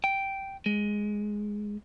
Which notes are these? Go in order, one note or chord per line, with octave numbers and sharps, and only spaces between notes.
G5
G#3